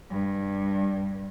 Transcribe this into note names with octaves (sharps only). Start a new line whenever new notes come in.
G2